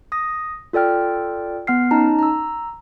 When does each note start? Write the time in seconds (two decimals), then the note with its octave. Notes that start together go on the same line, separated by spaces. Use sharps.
0.12 D#6 A#6
0.73 F4 A4 D5 G5 F6
1.67 B3 F#5 F6 C7
1.91 C#4 D#4 A5 A#5
2.19 A#5 E6